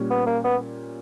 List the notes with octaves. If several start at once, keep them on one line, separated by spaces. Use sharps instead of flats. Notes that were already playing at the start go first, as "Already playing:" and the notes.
Already playing: A#2 G3 C#4
B3
A#3
B3